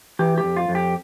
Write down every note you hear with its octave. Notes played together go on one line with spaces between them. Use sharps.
E3 G4
G4
F2
F4
F2
G4